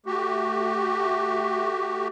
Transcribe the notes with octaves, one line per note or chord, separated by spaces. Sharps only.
A3 F#4 G4